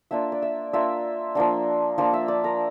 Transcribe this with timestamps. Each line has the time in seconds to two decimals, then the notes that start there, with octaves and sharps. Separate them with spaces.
0.11 A#3 D4 F4 E5
0.32 D5
0.42 E5
0.73 A#3 D4 F4 E5
1.35 F3 A#3 D4
1.98 F3 A#3 D4 F5
2.14 E5
2.28 D5
2.44 A#4